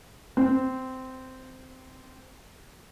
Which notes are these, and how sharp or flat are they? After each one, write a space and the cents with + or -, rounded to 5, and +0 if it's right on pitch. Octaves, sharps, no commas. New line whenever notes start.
C4 -15